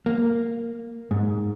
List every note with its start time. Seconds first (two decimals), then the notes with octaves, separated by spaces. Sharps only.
0.06 A#3
1.11 G#2